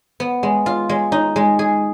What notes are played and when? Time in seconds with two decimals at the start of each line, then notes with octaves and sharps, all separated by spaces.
0.20 B3
0.43 G#3
0.66 F4
0.89 G#3
1.12 D#4
1.36 G#3
1.59 G#4